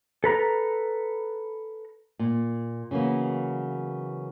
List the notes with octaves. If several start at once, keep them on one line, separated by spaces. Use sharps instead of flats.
A4 B4 A#5
A#2
C#3 E3 F#3 A#3 B3